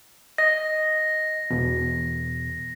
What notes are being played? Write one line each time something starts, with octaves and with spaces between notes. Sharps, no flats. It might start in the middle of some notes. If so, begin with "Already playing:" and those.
D#5 A#6
E2 B2